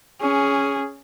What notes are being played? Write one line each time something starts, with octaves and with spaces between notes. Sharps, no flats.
C#4 G#4